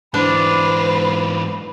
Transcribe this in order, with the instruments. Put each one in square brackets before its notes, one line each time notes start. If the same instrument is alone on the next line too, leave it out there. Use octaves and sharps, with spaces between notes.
[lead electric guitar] G#2 E3 [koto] D4 [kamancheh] B4 C5